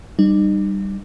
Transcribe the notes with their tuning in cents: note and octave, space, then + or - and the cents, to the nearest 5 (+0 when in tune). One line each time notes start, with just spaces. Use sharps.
G3 +0 D#4 -40